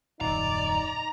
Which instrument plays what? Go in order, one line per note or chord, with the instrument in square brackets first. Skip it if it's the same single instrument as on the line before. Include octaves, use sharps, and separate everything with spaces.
[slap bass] D#1 F#2 [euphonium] D#4 [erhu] D5 [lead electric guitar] A#5